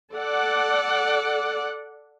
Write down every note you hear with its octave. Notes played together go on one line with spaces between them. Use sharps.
A4 D5 F#5